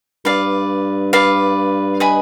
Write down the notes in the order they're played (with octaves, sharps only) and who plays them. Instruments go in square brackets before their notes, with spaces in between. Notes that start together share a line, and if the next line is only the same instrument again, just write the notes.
[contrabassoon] G2 [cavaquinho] B4 D5 F5
[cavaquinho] B4 D5 F5
B4 D#5 G#5 B5